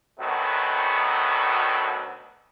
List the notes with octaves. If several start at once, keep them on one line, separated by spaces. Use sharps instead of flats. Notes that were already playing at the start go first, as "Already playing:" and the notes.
D2 B2 D#3 F#3 A3 B3